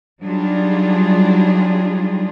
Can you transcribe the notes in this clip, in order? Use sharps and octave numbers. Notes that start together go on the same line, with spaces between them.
F#3 G3 D4 D#4 F4 G#4